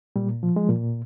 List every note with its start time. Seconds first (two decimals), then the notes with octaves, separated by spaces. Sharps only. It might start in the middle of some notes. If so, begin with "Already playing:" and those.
0.16 A#2 G3
0.43 F3
0.56 G#3
0.69 A#2